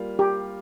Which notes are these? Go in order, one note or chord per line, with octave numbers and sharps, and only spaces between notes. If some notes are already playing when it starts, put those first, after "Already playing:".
Already playing: G3 A#3 F4
G4